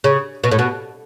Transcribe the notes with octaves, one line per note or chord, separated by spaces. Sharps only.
C#3
B2
A2
B2